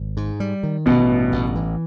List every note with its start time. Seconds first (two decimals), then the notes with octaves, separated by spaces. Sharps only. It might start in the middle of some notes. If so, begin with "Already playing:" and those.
Already playing: G#1
0.17 G#2
0.40 G3
0.63 D#3
0.86 A1 B2 B3
1.09 G2
1.32 A1
1.56 E3